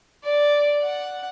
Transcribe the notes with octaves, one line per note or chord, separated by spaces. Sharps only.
D5
F#5